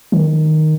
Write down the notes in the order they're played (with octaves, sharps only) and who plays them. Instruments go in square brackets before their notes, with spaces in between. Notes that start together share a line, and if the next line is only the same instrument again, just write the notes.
[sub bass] D#3